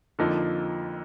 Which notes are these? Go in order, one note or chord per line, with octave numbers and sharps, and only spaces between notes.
F2 D3 F3 A#3 D#4